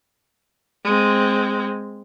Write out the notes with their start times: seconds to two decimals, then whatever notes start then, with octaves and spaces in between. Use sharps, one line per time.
0.84 G#3 C4